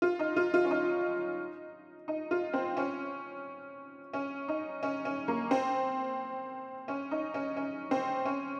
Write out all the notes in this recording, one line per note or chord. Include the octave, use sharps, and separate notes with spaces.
F4
D#4
F4
F4
C#4
D#4
D#4
F4
C4
C#4
C#4
D#4
C#4
C#4
A#3
C4
C#4
D#4
C#4
C#4
C4
C#4